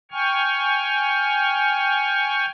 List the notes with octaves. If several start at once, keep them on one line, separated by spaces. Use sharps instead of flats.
G5 G#5 C#6 F6